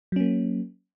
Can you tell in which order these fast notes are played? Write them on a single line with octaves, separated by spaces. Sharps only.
F#3 C#4 A#3